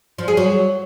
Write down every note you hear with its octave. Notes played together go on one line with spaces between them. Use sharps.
F3
G#4
F#3